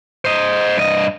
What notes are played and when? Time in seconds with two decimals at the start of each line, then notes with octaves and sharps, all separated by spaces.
0.25 C5 D#5
0.77 G2 D#5